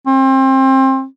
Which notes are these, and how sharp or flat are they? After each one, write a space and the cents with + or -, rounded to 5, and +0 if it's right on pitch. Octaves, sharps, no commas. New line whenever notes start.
C4 +30